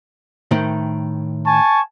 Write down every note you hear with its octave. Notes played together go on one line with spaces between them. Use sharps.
A2 D#3 C5
G#5 A5 C#6